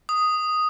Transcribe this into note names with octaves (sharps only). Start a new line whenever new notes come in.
D#6